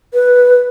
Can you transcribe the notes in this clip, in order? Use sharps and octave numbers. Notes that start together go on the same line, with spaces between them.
B4